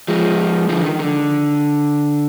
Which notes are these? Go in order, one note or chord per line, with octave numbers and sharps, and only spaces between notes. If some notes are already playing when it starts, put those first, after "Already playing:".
F3 G#3
D3 F3
D#3
D3